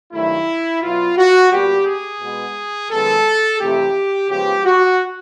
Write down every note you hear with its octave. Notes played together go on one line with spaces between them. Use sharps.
G2 D#3 F#3 A3 E4
B2 F#3 B3 F4
F#4
A#2 G3 B3 G4
G#4
B2 G#3 B3
F#2 D#3 G#3 B3 A4
F2 C3 E3 A3 G4
C#3 F3 G#3 B3 G4
F#4